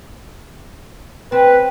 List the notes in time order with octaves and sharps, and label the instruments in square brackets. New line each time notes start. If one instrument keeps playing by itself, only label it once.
[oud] C4 [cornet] B4